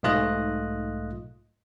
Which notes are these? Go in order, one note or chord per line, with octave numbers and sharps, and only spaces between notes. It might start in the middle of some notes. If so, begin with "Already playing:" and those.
B1 G#2 A3 F4 D#5 F#6